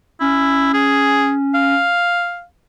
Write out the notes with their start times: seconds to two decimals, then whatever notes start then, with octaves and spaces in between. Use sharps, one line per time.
0.21 C#4 E4
0.73 G#4
1.54 F5